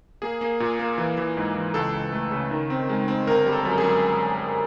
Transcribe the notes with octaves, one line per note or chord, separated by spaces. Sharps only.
A#3 G#4
A#3
A#2
A#3
E3
E3
G#2
E3
C#2 A4
C#2
A3
C#3
D#3
C4
G#3
C4
G1 A#4
G3
A4
F#2
G#4
F#2